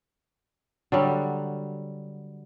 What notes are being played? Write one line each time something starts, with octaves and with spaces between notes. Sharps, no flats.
D3 F#3 G3